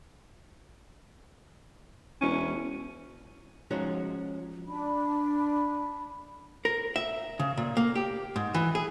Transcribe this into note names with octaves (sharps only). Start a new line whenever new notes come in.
E1 C#4
F3 G#3 C#4 D#4 F#4 C#5
D4 B5
A#4
E5
C#3
A#2
A#3
G4
G#2
E3
G#4